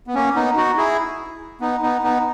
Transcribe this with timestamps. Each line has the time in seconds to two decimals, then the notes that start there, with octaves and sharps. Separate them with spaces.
0.07 B3
0.15 A#3 C#4
0.35 B3 D#4
0.56 D#4 F#4
0.77 E4 G#4
1.61 B3 D#4
1.82 B3 D#4
2.03 B3 D#4